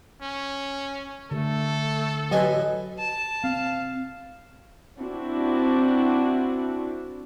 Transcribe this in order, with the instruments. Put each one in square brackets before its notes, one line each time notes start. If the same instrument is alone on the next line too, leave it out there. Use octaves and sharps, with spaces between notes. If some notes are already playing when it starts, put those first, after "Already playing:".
[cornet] C#4
[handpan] D3 [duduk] A3 [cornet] A4
[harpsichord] A1 D#5 G#5 [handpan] F#3 [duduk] B4
[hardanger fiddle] A5
[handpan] C4 [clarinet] F5
[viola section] C4 D4 E4 F#4